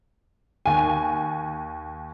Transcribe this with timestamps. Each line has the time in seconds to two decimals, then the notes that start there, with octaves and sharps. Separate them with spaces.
0.66 D#2 G#5